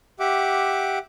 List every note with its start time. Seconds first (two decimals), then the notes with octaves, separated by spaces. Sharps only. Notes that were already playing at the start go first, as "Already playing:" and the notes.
0.20 G4 E5 F#5 D6